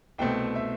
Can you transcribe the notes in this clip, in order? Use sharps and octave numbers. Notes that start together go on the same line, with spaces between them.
C2 B2 A3 C4 G5
E5